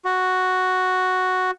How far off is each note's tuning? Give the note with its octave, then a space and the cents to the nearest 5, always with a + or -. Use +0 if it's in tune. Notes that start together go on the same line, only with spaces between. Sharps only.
F#4 +0